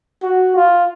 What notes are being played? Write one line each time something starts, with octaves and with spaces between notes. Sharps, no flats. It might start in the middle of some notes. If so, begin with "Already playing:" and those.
F#4
F4